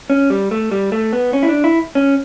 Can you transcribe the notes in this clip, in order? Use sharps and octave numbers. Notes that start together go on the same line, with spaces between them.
C#4
G3
A3
G3
A3
B3
C#4
E4
D4
E4
C#4